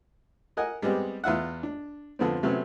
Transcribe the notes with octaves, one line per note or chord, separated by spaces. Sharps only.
A#4 D#5 F#5 G#5
G3 G#3 B3 C4 G4
E2 F4 E5 F#5
D4
F2 D3 B3 C4
C3 F#3 A3 B3 C#4